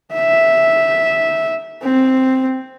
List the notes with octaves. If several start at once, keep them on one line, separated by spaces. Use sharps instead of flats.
E5
C4